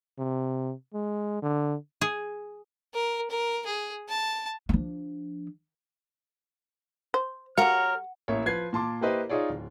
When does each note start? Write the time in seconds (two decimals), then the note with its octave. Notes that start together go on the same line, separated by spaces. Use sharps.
0.19 C3
0.94 G#3
1.42 D3
2.01 G#4
2.94 A#4
3.30 A#4
3.66 G#4
4.08 A5
4.69 F3 D4
7.14 C5
7.58 G3 F#4 A#4 C#5 F5 F#5 F6
8.28 A1 A#3 E4 C#5
8.46 F3 B4 G#6 C7
8.73 A#2 A5 C6 D6
9.01 A#3 E4 G4 B4 C5 D#5
9.29 D#4 F4 G#4 C#5 D5
9.50 D1